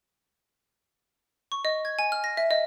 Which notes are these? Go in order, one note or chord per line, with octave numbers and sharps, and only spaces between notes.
C#6
D#5
G#6
G#5
F6
A#6
E5
D#5